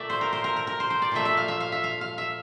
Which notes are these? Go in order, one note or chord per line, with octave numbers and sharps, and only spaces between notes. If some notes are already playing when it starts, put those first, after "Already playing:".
Already playing: A#2 A3 D5 E5
C5
A#4
C5
A#4
A#4
A#4
C5
C5
D5
A#2 F3 A3 E5
E5
F5
E5
F5
E5
F5
F5
E5